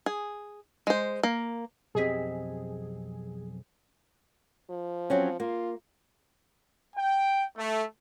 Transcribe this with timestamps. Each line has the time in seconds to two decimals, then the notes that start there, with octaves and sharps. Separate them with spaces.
0.06 G#4
0.87 G#3 C5
1.23 A#3
1.95 B1 F2 C4 G4 G#4 D#5 B6
4.70 F3
5.10 F#3 C4 C#4
5.40 A#3 F4
6.96 G5
7.56 A3